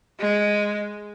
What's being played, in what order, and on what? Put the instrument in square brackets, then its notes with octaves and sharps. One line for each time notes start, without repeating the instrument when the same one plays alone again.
[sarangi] G#3